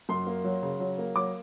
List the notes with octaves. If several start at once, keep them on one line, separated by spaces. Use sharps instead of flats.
F#2 C6
A#3
F#3
C#3
F#3
A#3
F#3 D6